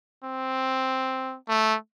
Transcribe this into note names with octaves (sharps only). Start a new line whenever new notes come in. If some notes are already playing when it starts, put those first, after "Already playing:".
C4
A3